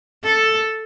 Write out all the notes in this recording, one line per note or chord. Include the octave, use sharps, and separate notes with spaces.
A4